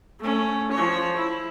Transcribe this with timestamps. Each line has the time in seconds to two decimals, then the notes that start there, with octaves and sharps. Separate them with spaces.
0.20 A3 C#4
0.72 F3 C#5
1.17 E4